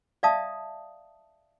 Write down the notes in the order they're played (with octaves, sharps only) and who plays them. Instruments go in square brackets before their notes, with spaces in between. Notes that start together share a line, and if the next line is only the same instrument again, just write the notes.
[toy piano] D5 E5 F5 A5 D#6